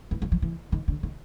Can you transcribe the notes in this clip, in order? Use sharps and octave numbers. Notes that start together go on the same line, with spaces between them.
E3
F3
F3
E3
D#3
D3
D#3